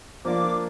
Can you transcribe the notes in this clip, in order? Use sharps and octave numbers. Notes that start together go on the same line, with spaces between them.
F3 A#3 D4 F4 D6